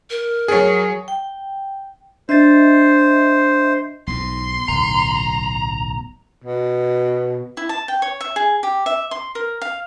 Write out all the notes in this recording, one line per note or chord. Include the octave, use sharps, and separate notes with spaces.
A#4
F#3 G#4 C#5
G5
D4 C5 D#5 E5 A6
B1 G#2 C6
D1 B1 A#5
B2
E4
A5
G5
C#5
E5
G#4
G4
E5
C6
A#4
F5